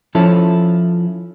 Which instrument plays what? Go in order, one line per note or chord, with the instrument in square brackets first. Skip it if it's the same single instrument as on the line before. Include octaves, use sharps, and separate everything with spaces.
[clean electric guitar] F3 C#4 E4 A4